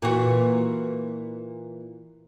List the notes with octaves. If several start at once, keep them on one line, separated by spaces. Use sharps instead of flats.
A#2 E3 F#4